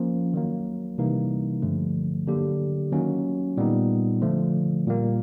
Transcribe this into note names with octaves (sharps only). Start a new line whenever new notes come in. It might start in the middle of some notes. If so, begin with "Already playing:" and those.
Already playing: F3 A#3 C#4
D#3 F#3 A#3
C3 E3 G3 A#3 D#4
G2 D3 F3 A3
D3 F#3 A#3 D4 G4
D#3 F#3 A#3 C#4
A#2 G3 B3 D#4
D3 F3 A3
A#2 G3 A#3